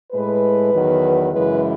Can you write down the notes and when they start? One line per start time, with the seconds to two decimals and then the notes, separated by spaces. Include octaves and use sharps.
0.11 A2 G#3 B4
0.72 E2 D#3 F#3
1.31 F#2 C#3 E3 G#3 B4